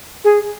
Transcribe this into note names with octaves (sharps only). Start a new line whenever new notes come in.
G#4